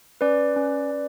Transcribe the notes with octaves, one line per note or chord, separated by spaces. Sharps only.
C#4 B4 D5
C#4
C#4